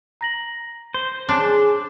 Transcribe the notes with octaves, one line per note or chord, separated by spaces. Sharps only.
A#5 A#6 F#7
C5
D4 G#4 C#5 C6 D6